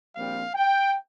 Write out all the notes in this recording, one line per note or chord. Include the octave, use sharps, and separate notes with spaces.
A#1 A#2 G3 C4 F5
G5